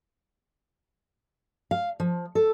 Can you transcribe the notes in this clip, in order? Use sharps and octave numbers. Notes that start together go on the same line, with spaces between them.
F5
F3
A4